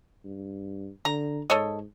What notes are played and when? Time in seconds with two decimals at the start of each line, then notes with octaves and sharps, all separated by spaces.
0.25 G2
1.05 D3 A#5
1.50 G#2 A4 C#5 D#5